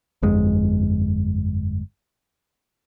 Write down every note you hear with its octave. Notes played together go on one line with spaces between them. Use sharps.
G1 F2 G#3